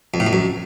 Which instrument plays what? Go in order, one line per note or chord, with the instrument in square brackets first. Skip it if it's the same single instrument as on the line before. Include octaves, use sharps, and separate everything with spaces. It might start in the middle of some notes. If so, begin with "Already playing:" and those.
[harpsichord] F2
A2
F2
F#2